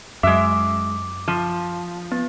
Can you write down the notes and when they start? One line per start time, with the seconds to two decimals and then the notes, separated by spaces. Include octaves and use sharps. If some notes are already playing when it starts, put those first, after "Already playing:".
0.23 F#2 G#3 E5 D6
1.28 F3
2.12 B3